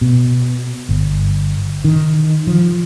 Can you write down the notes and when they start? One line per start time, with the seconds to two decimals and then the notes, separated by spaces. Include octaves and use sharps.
0.01 B2
0.89 G1
1.85 D#3
2.47 F3